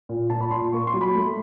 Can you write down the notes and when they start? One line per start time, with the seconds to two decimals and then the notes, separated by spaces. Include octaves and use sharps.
0.09 A#2
0.30 A#2 A5
0.41 B5
0.51 A#2 C6
0.73 A#3 C#6
0.87 C6
0.94 F#3
1.01 B5
1.15 A3